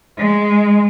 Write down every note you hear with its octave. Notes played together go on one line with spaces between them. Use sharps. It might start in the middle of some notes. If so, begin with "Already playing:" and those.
G#3